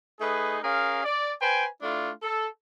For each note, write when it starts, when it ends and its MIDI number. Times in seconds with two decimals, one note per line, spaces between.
0.20 0.57 57
0.20 0.57 63
0.20 0.57 68
0.20 0.57 71
0.63 1.02 61
0.63 1.02 68
0.63 1.02 70
0.63 1.02 77
1.04 1.31 74
1.40 1.66 71
1.40 1.66 72
1.40 1.66 79
1.40 1.66 80
1.81 2.11 57
1.81 2.11 62
1.81 2.11 64
1.81 2.11 65
2.23 2.47 69